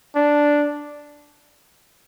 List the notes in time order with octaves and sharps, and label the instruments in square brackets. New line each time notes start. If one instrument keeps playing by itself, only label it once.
[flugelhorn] D4